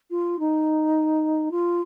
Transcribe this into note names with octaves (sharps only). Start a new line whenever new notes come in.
F4
D#4
F4